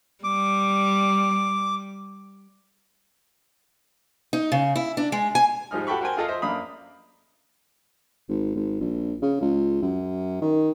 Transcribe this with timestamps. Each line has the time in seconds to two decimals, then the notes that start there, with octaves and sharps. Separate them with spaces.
0.24 G3 D6
4.33 D#4
4.52 C#3
4.76 E4
4.97 D4
5.12 G#3
5.35 G#5
5.71 G#2 F3 G3 D#4 F6
5.87 F#4 G4 A4 G5 B5 C#6
6.01 F#4 A#4 C5 G5 G#5
6.17 F4 G#4 A4 D#5 F5
6.28 C5 D#5 E5
6.42 F#2 A#3 D4 F5 B5 D#6
8.29 G#1
8.56 G#1
8.81 A#1
9.22 C#3
9.41 C#2
9.82 F#2
10.42 D#3